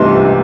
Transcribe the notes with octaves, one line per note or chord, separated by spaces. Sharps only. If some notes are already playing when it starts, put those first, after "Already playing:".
Already playing: C2 C3 E3 A3 D4 C6